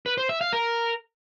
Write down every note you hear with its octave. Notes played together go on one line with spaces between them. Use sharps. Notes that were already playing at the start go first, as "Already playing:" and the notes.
B4
C5
E5
F5
A#4